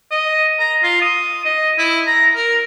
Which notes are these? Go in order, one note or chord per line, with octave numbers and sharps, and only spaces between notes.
D#5
A#5
F4
D#6
D#5
E4
A#5
A#4